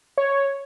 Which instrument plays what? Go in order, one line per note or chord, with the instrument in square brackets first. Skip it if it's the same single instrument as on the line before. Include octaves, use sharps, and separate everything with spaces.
[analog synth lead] C#5